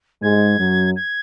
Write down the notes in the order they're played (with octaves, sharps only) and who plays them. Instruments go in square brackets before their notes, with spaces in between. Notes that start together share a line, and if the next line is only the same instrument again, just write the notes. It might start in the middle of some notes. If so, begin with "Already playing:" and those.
[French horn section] G#2 G#3 [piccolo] G#6
[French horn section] F#2 F#3
[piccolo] G#6